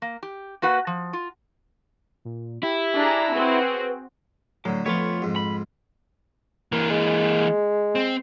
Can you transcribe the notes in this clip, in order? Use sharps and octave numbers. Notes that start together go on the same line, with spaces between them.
A#3
G4
A#3 F#4 B4 F#5
F3
F4
A#2
E4 G4
D4 G#4 A#5
C4 F#4 G#4 B4
A2 D3 F#3
F2 A3 B3 F4 C#5
F2 G#2
B5
E3 A#3 A#4
G#3
C4